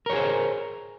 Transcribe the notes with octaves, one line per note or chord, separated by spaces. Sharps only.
G#4 A#4 C5 C#5